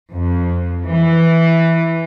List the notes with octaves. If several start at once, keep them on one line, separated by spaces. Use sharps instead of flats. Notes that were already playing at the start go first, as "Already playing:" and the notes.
F2
E3